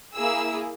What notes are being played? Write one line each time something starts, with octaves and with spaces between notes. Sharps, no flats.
A#3 E4 G#4 E6